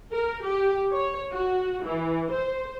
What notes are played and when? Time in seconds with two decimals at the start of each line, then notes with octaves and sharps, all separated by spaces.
0.12 A#4
0.44 G4
0.93 C#5
1.31 F#4
1.85 E3
2.32 C5